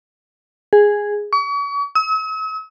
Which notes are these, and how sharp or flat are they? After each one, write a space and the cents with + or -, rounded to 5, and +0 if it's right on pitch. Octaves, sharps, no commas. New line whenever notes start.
G#4 -5
C#6 +40
E6 -45